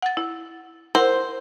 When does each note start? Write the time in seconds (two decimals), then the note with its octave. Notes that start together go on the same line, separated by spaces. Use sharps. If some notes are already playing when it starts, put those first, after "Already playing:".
0.02 F#5 A6
0.17 E4
0.95 E4 A#4 C5 F#5